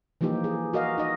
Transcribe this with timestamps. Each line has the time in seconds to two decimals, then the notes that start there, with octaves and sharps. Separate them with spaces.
0.21 E3 F3 A#3 D#4 G4
0.44 G#4
0.73 F#4 A#4 D#5 F5
0.98 D#4 D#5